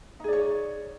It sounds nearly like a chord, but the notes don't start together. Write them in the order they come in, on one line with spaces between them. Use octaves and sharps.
D#4 G#4 D5 C#5